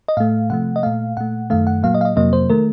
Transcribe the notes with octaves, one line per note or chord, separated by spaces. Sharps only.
D#5
A2 A3 F5
C3 F3 A3 F#5
D#5
A#2 A3 F5
A#2 A3 F#5
F#2 D#3 A3 F5
F#5
A#2 F#3 A#3 F5
D#5
F5
D#5
F2 C3 F#3 A#3 D#5
C5
D#3 A3 A#4